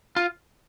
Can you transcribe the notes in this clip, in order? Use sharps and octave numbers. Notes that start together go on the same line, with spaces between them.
F4